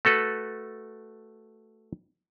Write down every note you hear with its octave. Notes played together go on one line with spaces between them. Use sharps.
A3 F#4 A4 B4